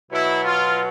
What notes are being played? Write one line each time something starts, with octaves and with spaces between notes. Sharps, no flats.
B2 F#3 E4
F4